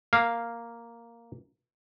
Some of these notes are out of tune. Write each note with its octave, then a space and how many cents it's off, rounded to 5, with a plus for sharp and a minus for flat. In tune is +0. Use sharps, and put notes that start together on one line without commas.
A#3 +0 F5 +0